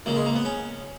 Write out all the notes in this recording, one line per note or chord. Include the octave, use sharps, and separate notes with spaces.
C#2 C#3 A#3
G#3
A#3
B3
C#4